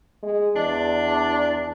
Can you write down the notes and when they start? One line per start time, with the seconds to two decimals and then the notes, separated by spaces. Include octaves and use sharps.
0.23 G#3
0.56 E2 D4